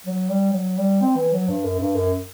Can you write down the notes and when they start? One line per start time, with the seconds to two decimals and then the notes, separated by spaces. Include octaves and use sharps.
0.07 F#3
0.29 G3
0.53 F#3
0.78 G3
1.01 C4
1.16 E3
1.33 F#3
1.49 G2
1.65 F#2
1.80 G2
1.95 F#2